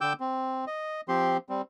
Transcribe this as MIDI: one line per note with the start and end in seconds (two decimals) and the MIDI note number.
0.01 0.13 50
0.01 0.13 79
0.01 0.13 86
0.01 0.13 88
0.01 0.13 91
0.20 0.65 60
0.67 1.01 75
1.08 1.37 53
1.08 1.37 60
1.08 1.37 67
1.08 1.37 84
1.49 1.62 55
1.49 1.62 60